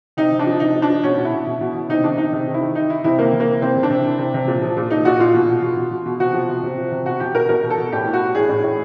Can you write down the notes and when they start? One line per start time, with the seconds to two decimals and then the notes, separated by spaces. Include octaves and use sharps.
0.17 C3 D#4
0.32 C3
0.39 D4
0.46 F3
0.60 C3 D#4
0.75 F3
0.82 D4
0.90 F3
1.03 B2 C#4
1.18 B2
1.25 E4
1.32 B2
1.47 B2
1.61 B2
1.75 B2
1.89 C3 D#4
2.04 D#3 D4
2.18 C3 D#4
2.33 C3
2.48 D#3
2.54 E4
2.61 D#3
2.75 E3 D#4
2.90 E3 E4
3.04 C3 E4
3.19 C3 A#3
3.33 C3
3.40 A#3
3.47 E3
3.61 C3 C4
3.76 C3
3.83 D4
3.90 C3
4.05 E3
4.19 C3
4.34 C3
4.48 A#2
4.62 F3
4.77 A#2
4.90 A#2 D#4
5.05 A#2 F#4
5.19 A#2 F4
5.34 B2
5.48 B2
5.62 B2
5.77 B2
5.91 B2
6.06 B2
6.20 C3 F#4
6.34 F3
6.49 C3
6.63 C3
6.77 F3
6.92 C3
7.06 B2 F#4
7.20 B2 G4
7.35 B2 A#4
7.49 B2 A#4
7.64 B2
7.70 A4
7.78 B2
7.92 A2 G4
8.06 E3
8.13 F#4
8.21 E3
8.35 A2 G#4
8.49 A2
8.64 A2